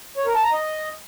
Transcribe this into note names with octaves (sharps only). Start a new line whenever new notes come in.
C#5
A#4
A5
A#5
D#5